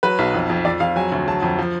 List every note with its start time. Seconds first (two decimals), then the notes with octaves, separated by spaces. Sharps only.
0.03 F#3 B4
0.19 B1
0.34 F2
0.50 F2
0.65 F2 D5
0.80 F2 F5
0.96 F#3 G#5
1.12 D2
1.28 F#3 A5
1.42 F2
1.59 F3